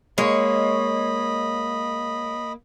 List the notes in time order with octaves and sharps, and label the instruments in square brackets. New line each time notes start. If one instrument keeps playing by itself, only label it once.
[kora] G#3 [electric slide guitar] A#3 [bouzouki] C#5 [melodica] D#5 B5